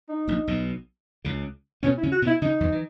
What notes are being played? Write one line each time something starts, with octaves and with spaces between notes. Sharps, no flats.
D#4
A#1 A#2
B1 B2
C#2 C#3
B2 B3 C#4
E4
C#3 C#4
F#4
B2 B3
E4
C#3 C#4 D#4
E2 E3
E3